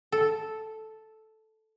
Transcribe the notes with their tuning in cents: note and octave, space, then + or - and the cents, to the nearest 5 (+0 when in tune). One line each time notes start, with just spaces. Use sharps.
A4 -5